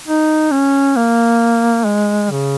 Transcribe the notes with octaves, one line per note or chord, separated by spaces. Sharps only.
D#4
C#4
A#3
G#3
C#3